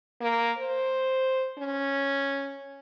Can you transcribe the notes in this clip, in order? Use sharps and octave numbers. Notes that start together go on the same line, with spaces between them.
A#3
C5
C#4